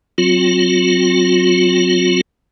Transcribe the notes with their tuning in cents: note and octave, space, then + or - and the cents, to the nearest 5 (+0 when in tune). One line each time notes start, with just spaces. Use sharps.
F#3 +0 C4 +5 F4 +35